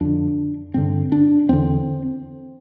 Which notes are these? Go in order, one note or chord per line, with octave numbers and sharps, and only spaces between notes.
F2 D3 D4
G2 D3 C4
D4
E2 D3 C4